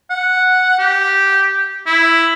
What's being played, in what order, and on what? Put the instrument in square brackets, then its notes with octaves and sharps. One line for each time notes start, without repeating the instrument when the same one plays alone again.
[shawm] F#5
G4
E4